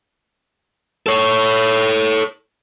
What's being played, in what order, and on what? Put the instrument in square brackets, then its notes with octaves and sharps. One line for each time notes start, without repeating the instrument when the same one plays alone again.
[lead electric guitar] A4 C#5